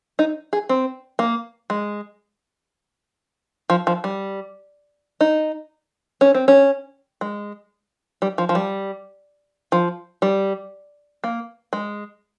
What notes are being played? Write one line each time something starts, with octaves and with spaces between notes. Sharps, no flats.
D#4
G#4
C4
A#3
G#3
F3
F3
G3
D#4
C#4
C4
C#4
G#3
G3
F3
F3
G3
F3
G3
A#3
G#3